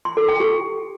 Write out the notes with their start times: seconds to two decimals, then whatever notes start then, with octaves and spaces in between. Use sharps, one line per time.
0.05 C6
0.17 A4
0.29 G5
0.40 G4